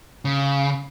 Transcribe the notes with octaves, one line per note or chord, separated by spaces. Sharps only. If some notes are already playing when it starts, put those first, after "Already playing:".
C#3